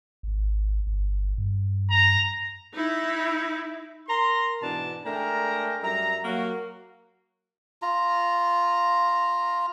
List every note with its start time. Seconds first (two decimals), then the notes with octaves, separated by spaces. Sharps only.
0.23 G#1
0.87 G1
1.38 G2
1.90 A#5
2.74 D#4 E4
4.09 A#4 A#5 C6
4.63 G#2 B2 E3 D4 A5
5.06 G#3 A3 D4 A#4 G5 A#5
5.83 F#2 G3 E5 A#5
6.24 F#3 A#3 F#4
7.82 F4 A#5